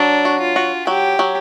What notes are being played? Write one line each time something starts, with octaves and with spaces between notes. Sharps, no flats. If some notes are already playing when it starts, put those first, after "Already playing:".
Already playing: F#3 D4
F#4
F4
F#4
F#3 G4
F#3